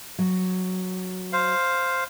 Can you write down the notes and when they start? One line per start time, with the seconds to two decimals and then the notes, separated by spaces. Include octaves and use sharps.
0.19 F#3
1.33 C5 F5